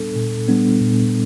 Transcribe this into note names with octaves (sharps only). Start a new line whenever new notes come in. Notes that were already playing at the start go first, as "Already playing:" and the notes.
Already playing: A#2 G3 B3 D4 A4
A#2
G3 B3 D4
A#2